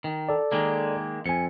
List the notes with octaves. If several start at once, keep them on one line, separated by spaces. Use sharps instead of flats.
D#3
A4 D5
D#3 G#3 A#3
F2 G#5 C#7